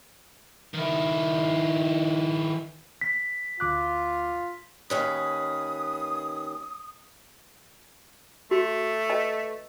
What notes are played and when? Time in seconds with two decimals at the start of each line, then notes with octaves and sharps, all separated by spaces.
0.74 D#3 E4
3.01 B6
3.60 D2 F4 D6 F#6
4.90 D#2 C#4 B4 D#6
8.51 A3 F#4
9.10 B4 D#5 A5